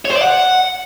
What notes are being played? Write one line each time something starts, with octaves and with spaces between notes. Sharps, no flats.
C#5
C5
D5
F#5